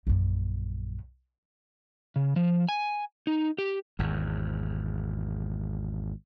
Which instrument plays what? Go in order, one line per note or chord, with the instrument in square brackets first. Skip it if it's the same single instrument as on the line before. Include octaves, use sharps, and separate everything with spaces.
[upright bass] A#1 F#2
[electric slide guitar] C#3
F3
G#5
D#4
G4
[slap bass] G#1 E2